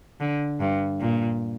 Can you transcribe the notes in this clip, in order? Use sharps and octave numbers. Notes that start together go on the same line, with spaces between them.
D3
G2
A#2